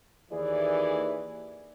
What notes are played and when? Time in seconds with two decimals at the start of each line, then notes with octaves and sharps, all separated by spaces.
0.32 D#2 E3 G#4 D5